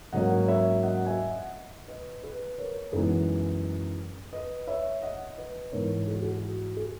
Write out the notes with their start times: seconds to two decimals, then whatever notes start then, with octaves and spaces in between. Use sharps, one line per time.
0.13 G#2 F#3 A#3 C#4 D#5 F#5
0.48 C#5 E5
0.83 D#5 F#5
1.06 E5 G#5
1.29 D#5 F#5
1.88 B4 D#5
2.23 G#4 B4
2.58 A#4 C#5
2.92 F#2 E3 G#3 B3 D#4 G#4 B4
4.33 B4 D#5
4.67 C#5 E5
5.02 D#5 F#5
5.37 B4 D#5
5.72 G#2 E3 B3 D#4 A#4 C#5
6.07 G#4
6.15 F#4
6.22 G#4
6.43 F#4
6.77 G#4